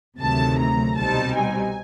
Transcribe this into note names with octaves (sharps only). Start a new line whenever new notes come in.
D2 C3 D#3 F#3 A3 A5
A#5
C2 B2 G3 C4 D#4 A5
G#5